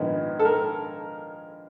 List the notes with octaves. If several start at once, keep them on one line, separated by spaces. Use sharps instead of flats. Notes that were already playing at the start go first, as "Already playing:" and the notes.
Already playing: A#1 G#2 D#3 G#3 B3
A4
A#4